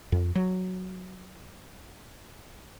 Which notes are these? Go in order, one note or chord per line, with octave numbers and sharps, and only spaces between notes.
F2
F#3